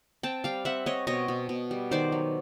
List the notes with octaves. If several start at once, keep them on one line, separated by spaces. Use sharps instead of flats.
C4 G5 A5
G3 F5 G5
C4 E5 F#5
C4 C#5 D#5
B2 C#5 D#5
B2
B2
G3
D#3 C5 D5
F#3